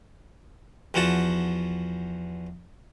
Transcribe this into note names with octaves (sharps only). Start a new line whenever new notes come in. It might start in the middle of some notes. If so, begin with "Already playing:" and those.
E2 F3 F#4 F#5 A5